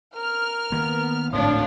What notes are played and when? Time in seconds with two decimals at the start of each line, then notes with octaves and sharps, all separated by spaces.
0.15 A#4 F6
0.72 D#3 A#3 B3
1.32 G#1 D2 A2 F3 D4 C#5 F5